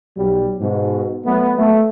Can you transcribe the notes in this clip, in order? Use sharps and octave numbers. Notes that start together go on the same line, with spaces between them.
B1 F#3 G3
G#2 B2
F#3 A3 B3
A3